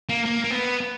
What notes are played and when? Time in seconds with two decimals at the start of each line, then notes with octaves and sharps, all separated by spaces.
0.09 A#3
0.26 A#3
0.44 A#3
0.50 B3